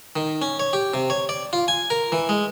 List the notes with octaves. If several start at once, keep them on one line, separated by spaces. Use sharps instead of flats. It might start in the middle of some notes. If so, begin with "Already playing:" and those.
D#3
C#4
C#5
G4
C3
C#5
D5
F4
G#5
A#4
E3
G#3